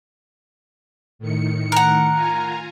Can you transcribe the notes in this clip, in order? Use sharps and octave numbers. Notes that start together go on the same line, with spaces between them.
A2 D#3 C#7
A#4 F#5
F4 G#5 A#5